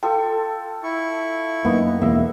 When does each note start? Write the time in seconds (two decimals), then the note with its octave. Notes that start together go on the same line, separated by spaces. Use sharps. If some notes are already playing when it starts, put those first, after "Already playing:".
0.03 F4 A4 G5 D#6
0.83 E4 C#6
1.65 F#2 A#3 B3 D#4
2.02 E1 E2 A#3 E5